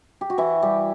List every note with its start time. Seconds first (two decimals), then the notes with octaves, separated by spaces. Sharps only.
0.21 G4
0.30 F#4
0.38 E3 E4
0.62 G3 G4